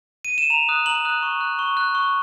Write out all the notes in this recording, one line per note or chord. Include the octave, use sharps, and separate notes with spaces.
D#7
E7
A#5 F7
D#6 F#6
A#5 F#7
D#6 F#6
C#6
F#6
C#6
F#6
C#6